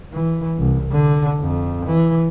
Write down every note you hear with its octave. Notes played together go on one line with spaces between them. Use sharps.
E3
C2
D3
F2
E3